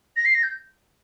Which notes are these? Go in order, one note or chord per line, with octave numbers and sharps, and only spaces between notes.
A#6
C7
A#6
G6